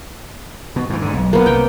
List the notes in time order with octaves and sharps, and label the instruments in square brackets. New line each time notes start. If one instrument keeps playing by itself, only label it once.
[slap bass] B2
G#2 E3
G#2 D3
B1
[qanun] A#3 B3
[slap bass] C2 [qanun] G5